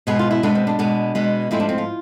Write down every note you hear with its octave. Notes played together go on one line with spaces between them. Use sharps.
B2 G#3 B3 G#4
F4
E4
B2 G#3 B3 D4
C4
D4
B2 G#3 B3
B2 G#3 B3
A2 F3 G#3 C4 E4
D4
C4
F4